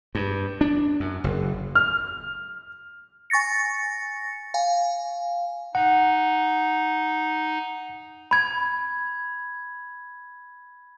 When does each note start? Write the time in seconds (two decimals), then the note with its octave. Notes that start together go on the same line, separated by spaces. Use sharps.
0.15 G2
0.61 D4
1.00 F#2
1.24 F#1
1.75 F6
3.30 G#5 C#6 A6 A#6 C#7
4.54 F5 G#5
5.75 D#4 F#5
8.31 B5 G#6